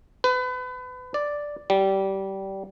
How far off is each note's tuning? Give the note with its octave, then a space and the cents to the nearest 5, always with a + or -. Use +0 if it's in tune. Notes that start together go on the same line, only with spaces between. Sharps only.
B4 +30
D5 +0
G3 -20